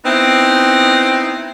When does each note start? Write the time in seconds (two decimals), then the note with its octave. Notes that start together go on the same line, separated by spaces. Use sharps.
0.05 B3 C4 D#4 E4